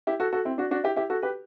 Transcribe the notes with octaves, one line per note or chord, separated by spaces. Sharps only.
E4 G4
F#4 A4
F#4 A4
C4 E4
D4 F#4
D4 F#4
E4 G4
E4 G4
F#4 A4
G4 B4